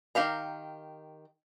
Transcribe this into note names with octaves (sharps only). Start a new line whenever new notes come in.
D#3 G4 F5 A#5